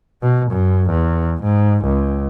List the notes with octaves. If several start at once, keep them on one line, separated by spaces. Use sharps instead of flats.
B2
F#2
E2
G#2
C#2